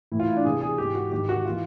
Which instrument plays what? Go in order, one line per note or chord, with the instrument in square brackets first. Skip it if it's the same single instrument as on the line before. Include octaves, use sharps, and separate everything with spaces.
[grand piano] A2 E3 E4
F4
E4
D4
E2 C3 E3 G#4
G#4
G#2 E3 G4
F#4
G#2 D#3 G4
F#4
E3 F4